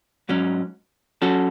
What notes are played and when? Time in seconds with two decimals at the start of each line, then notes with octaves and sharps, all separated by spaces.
0.29 G#2 F#3 C#4
1.22 F#3 C#4 F#4 A4